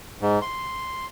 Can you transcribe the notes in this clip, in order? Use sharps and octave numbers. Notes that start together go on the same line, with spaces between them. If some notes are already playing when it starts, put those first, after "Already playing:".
G#2
C6